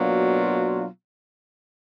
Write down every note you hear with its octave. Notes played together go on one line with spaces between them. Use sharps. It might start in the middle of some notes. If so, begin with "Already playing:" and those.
Already playing: B2 F#3 A#3 D4 F4